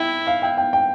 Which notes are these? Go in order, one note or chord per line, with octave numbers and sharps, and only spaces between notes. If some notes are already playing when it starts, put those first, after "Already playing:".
Already playing: E4 G5
F5
G5
G5
G5